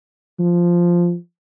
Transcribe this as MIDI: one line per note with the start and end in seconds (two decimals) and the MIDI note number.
0.40 1.15 53